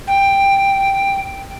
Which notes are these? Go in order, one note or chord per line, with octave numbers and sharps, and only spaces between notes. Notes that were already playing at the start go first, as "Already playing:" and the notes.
G5